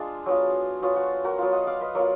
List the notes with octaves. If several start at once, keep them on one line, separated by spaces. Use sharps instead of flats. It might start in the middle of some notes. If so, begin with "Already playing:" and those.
Already playing: G#3 D4 F4 G#4
F#3 B3 F4
F#3 B3 F4 F#4
F#4
F#4 A#4
F#3 B3 F4
D#5 F#5
D5 F5
B4 D#5
F#3 B3 F4 A#4 D5